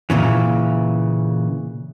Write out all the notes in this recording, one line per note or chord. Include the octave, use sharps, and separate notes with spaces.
A#2 C#3 E3